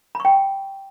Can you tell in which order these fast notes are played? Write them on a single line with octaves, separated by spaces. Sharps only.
B5 C#6 G5